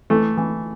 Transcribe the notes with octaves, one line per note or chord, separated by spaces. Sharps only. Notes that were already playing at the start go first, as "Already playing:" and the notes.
E3 A3
E3